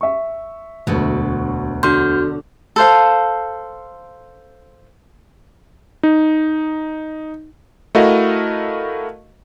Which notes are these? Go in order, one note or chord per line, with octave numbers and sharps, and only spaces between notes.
E5 C#6
E1 D2 B2 F#3
D3 F#4 C6 F6 G6
A4 C5 F5
D#4
A3 E4 F#4 A#4 D#5 F5